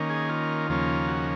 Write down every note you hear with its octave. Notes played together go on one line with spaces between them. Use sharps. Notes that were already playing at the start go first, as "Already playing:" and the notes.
Already playing: D#3 A#3 C#4
G#4
F4
D#2 C#3 F3 A#3 C#4
F#4